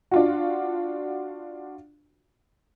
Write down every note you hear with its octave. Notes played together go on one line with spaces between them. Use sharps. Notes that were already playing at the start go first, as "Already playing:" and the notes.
D4 F4 F#4